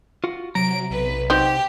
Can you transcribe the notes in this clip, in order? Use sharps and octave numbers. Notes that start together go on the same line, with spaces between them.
F4 F#4
C3 F#3 A#5 D7
B1 B4
C4 D#4 F#4 G4